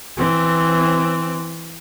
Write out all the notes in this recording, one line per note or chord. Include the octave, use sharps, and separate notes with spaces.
E3 C4